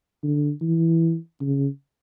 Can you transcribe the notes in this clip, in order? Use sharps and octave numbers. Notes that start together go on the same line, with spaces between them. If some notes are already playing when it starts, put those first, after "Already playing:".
D3
E3
C#3